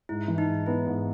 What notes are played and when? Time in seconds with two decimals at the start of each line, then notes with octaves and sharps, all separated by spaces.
0.09 G#2 E4
0.26 E3 E4
0.38 D#4
0.48 G#2
0.66 B3 E4
0.86 G#2